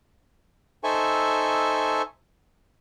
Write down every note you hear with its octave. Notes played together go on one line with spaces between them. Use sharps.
D#4 A4 C5 E5 G#5 C#6